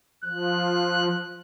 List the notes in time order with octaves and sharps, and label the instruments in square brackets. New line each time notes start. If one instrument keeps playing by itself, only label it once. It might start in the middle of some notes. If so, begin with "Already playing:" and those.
[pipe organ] F3 [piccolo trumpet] F#6